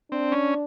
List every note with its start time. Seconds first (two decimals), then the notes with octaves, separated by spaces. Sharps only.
0.11 C4 D4
0.32 C#4